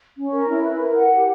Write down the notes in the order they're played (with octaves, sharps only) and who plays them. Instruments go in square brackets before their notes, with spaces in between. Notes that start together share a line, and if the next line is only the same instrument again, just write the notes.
[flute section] C#4
A#4
E4
B4
A#4
F#5
G4